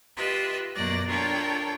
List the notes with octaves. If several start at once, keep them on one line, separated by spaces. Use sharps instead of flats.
F4 G4 B4 D#5 E5
F#2 B2 A#3 D5 F#6 A#6
D4 F4 A4 A#4 C#5 G5